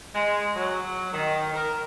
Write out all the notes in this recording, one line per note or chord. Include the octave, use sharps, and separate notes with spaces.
G#3
F#3
D#3
A#4